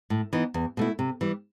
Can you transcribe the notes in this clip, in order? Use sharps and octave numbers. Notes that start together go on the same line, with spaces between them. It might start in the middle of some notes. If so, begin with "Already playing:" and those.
A2
E3 B3 D#4
E2
B2 A3 E4
C3
E3 G3